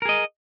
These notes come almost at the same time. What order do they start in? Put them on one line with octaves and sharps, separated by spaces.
A#4 G#4 D#5